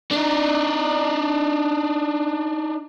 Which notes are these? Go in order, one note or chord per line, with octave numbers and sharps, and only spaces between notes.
D4 D#4